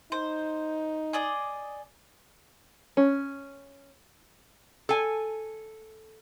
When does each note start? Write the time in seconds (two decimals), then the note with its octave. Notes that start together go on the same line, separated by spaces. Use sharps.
0.12 D#4 C5
1.13 G#4 D5 D#5
2.97 C#4
4.89 A4 G#5